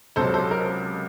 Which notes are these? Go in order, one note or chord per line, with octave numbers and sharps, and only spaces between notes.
C#2 C3 F#3 A4 C5
A4 C5
A#4